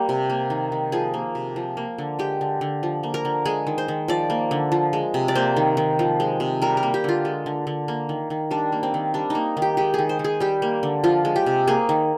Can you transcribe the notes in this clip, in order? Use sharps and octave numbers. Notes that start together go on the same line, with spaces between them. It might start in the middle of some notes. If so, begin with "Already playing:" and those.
Already playing: G3 A#3 G4
C3
A#3
D#3
D#3
F3 G#4
A#3
C3
F3
A#3
D3
G#3 G4
D3
D3
F3
A#3
A#4
D3
G#3 G#4
D#3
C5
D#3
F3 D5
A#3
D3
F3
G#3
C3
D5
A#3 C5
D#3
D#3
F3
G#3
C3
G3 A#4
A#4
A#3
G4
D3 F4
G#3
D3
D3
A#3
D#3
D#3
G3 D4
A#3
C4
D#3
G3 D4
A#3 D#4
D#3
G4
G#3 G4
D#3 G#4
C5
D#3
G#4
G3 G4
A#3
D3
F3 F4
G#3
G4
C3
A#3 G#4
D#3